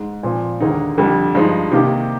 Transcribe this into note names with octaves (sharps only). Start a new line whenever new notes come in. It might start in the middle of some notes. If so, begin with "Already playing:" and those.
Already playing: G#2
A#2 F3 C4
D#2 D3 G#3 D#4
F2 D3 G3
G2 F3 G#3 D#4
C3 D#3 A#3 D#4 G4